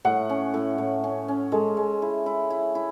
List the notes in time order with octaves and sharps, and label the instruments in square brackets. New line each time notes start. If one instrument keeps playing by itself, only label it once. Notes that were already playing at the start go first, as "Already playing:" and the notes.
[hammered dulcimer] A2 [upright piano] F#5
[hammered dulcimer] C#4
A2
A2
C#4
C#4
[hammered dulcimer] G#3 [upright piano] A4
[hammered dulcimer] G#3
E4
E4
E4
E4